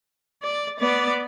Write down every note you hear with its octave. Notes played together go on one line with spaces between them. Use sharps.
D5
B3 D5